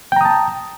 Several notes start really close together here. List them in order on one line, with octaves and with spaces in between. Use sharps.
G5 A#5 D#6 A5